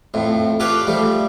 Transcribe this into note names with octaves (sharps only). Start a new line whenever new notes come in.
F2 A2
F4 G4 A4 B4 C#5 D5
F3 G3 A3